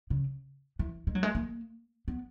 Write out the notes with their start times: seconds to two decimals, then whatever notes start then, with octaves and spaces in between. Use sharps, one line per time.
0.10 C#3
0.79 E3
1.07 G#3
1.15 F#3
1.23 G#3
1.35 A#3
2.08 B3